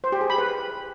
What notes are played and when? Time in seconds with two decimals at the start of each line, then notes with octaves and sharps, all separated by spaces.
0.04 C5
0.12 G4
0.21 G#4
0.30 B5
0.38 B4